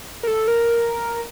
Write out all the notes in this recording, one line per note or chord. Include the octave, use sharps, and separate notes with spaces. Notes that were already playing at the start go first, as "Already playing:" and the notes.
A#4
A4
A#4